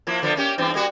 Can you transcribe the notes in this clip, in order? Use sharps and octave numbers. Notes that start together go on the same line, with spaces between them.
F3 A#3 E4
D3 F3 B3
A#3 C#4 G4
G2 E3 C4
G3 A#3 F#4